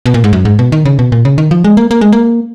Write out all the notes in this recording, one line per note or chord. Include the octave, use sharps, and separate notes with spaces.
B2
A#2
G#2
F#2
G#2
B2
D#3
C#3
B2
A#2
C#3
D#3
F3
G#3
A#3
A#3
G#3
A#3